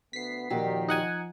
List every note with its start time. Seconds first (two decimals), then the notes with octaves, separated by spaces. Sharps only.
0.13 D2 B3 B6 C7
0.50 D#2 A#2 D#3 F3 F#4 G4
0.88 D#4 F#5 G#5